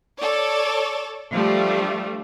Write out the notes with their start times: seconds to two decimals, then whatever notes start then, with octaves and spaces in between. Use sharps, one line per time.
0.18 A4 C#5 D5
1.33 F3 G3 A3 D4